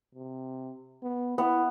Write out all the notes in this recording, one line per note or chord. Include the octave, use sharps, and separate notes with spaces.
C3
B3
B3 E4